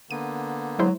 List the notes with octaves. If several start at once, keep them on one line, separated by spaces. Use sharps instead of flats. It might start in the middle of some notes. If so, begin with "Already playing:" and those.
D3 A#3 B3 D#7
F#3 G#3 E4 C5